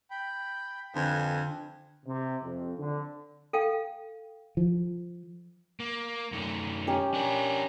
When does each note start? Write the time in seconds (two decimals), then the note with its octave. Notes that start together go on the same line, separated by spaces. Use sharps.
0.11 G5 B5
0.95 F2 D3 B4 G#5
2.06 C3
2.43 F2
2.78 D3
3.53 A4 F5 G5
4.57 F3
5.80 A#3
6.32 F#2 A3
6.87 C#4 G4 A#5
7.14 D4 A#4